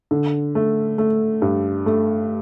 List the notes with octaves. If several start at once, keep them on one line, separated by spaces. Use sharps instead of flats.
D3
A3
A3
G2
A3